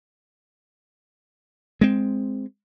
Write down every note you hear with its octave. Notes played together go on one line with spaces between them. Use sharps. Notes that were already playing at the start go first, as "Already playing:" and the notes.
G#3 C4